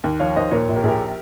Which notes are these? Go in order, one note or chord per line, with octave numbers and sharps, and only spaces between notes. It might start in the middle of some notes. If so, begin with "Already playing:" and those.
D#2
F3 C#5 F5
D#2 C5 D#5
A#2 A#4 C#5
A#1
G4 A#4
A#1 G4 G#4 A#4